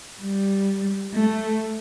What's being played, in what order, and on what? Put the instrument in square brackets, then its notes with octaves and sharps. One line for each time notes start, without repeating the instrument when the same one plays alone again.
[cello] G3
A3